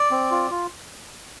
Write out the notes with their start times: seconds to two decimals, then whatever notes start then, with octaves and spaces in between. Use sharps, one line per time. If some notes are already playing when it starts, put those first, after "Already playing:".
Already playing: D5
0.11 C4
0.31 F4
0.51 F4